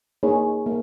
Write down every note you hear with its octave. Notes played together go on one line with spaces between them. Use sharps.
A#3 D#4 G#4 C#5
A#3